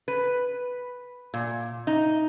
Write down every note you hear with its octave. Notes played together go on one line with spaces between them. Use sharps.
B4
A#2
D#4